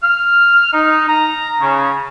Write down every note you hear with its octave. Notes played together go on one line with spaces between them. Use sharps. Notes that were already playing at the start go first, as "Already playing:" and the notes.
F6
D#4
A#5
C#3